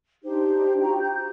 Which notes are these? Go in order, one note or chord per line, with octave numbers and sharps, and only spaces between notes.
D4 D#4 G4 C5
F4 F#4 G5 A#5
G6
G6